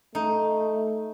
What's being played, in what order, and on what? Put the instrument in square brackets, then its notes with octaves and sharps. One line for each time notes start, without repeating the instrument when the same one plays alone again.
[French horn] A3 [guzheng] D#4